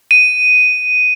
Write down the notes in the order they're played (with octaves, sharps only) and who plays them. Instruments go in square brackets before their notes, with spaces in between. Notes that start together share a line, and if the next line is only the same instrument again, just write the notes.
[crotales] D#7